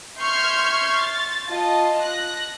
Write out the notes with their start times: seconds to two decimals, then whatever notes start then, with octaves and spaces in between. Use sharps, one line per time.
0.19 E5 C6 C#6 F6 G6 G#6
0.98 A6
1.48 F4 D#5 A5
2.01 F#6 A#6